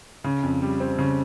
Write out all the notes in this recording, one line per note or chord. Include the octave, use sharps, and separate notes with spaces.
C#3
F2
G3
C4
C#3